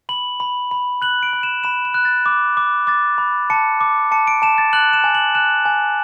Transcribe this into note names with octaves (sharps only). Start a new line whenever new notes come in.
B5 F#7
B5
B5
F#6 F#7
D7
B5
E7
B5 E7
E7
F#6
A6
D6
D6
D6 A6
B5
A5 C#7
D6
A5 C#7
D7
A5 E7
A6
F#6 F#7
E7
G#5
F#7
F#6 E7
G#5